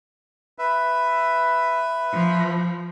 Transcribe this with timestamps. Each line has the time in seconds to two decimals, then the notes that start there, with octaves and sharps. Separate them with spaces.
0.59 B4 E5
2.13 F3